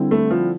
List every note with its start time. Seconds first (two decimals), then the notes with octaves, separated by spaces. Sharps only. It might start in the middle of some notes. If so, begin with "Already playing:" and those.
Already playing: D3 G3 C4 E4
0.11 A3
0.31 F3